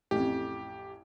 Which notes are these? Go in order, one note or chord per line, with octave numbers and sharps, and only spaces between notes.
A1 F2 G4